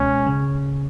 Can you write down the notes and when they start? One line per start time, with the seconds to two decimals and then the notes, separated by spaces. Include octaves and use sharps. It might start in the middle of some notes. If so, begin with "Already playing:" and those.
Already playing: C#2 B2 G#3 C#4
0.27 C#3